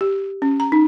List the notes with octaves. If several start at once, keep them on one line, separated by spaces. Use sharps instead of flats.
G4
C#4
A#5
D#4